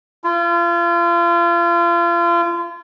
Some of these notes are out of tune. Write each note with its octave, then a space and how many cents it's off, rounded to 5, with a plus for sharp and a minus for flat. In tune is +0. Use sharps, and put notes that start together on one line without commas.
F4 -35